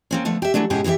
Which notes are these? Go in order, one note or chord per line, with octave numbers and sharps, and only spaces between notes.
A#3 C4 C#4
D3 F3 A3 B3
G4 E5
E3 F#3 A3 D4
G#2 B2 C#4 E4 G4 G#4
E3 C4 F#4 G4 E5